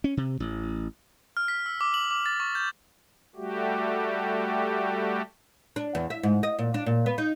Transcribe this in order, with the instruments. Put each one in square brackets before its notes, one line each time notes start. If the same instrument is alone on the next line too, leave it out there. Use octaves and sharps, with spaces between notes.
[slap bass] C#4
C3
A1
[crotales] F6
B6
E6
D6
F#7
D6
A6
C#6
G6
[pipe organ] G3 A3 F#4 G4
[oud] D4
E2
E5
G#2
D#5
A#2
D4
A#2
B3
D#4